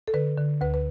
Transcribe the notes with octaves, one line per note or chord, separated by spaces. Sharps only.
A4
D3 B4
D3
D2 B4
B4